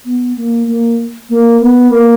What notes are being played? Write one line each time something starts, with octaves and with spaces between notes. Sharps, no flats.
B3
A#3
A#3
A#3
B3
A#3